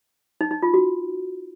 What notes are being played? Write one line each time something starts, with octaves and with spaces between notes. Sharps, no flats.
D#4
D#4
F4
F#4